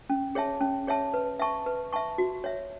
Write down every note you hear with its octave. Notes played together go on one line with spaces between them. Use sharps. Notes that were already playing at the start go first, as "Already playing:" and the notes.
C#4
G#4 C#5 E5 A5
C#4
G#4 C#5 E5 A5
B4
E5 A5 C#6
B4
E5 A5 C#6
F#4
C#5 E5